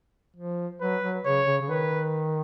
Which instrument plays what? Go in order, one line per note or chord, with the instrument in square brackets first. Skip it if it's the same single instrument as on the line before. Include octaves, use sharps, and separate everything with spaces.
[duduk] F3
[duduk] F#3 [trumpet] B4
[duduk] F#3
[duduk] C#3 [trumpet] C#5
[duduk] C#3
C#3
[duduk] D#3 [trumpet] B4